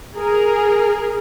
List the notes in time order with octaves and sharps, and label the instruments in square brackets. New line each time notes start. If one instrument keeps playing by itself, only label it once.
[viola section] G#4 A#4